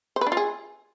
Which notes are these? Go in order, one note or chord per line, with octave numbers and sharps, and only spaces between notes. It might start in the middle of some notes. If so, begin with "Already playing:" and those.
C5
B4
D4
F4
G#4